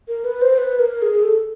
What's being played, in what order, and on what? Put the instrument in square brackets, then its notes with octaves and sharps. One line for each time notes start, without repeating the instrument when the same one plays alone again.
[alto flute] A#4
B4
C5
B4
A#4
G#4
A4